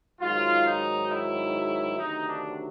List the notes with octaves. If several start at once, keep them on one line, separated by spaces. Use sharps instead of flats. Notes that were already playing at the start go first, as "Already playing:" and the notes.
G#2 D#3 F#3 F4
D#4
E4
D2 C3 D#3 F#3 D#4
D4